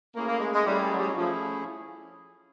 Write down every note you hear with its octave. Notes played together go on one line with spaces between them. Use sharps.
A3 A#3 C#4 E4 G#4
A#3
G#3
G#3
G3 A3 C#4 E4 G#4
F#3
G3
F#3
F3 A3 C#4 E4 G#4